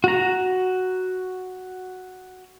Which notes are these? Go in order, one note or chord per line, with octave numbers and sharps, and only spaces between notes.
F#4 A#5